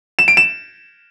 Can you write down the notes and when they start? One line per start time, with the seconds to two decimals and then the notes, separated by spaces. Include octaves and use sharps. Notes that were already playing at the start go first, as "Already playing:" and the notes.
0.19 E7
0.28 D7
0.37 E7